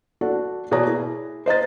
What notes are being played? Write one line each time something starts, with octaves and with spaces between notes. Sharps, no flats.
D4 F#4 A4 F#5
B2 G#4 C#5 D5 A#5 A#6
E4 G#4
C5 D#5 A#5 A6